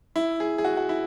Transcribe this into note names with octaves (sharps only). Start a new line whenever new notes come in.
E4
G#4
G#4
F#4
F#4
E4